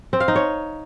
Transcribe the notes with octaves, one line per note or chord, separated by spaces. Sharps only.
C4
F5
D#4
C#5